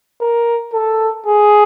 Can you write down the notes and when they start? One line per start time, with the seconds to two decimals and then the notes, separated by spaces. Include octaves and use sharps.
0.21 A#4
0.73 A4
1.26 G#4